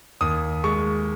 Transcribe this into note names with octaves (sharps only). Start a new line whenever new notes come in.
D#2 D#6
G#3 C#6